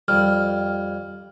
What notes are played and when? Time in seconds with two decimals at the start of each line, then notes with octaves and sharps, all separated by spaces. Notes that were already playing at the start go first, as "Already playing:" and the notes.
0.08 F2 G3 F6